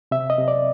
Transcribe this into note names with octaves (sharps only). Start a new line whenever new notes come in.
C3 E5
D#5
C3
D5